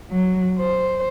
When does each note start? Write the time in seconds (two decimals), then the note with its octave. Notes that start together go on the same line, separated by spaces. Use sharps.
0.12 F#3
0.59 C5